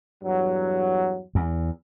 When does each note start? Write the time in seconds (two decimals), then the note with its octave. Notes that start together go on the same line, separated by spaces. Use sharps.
0.23 E2 G2 F#3
1.35 E2